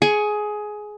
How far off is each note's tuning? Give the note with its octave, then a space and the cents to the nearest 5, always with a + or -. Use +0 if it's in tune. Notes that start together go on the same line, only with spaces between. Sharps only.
G#4 +15 C#6 +0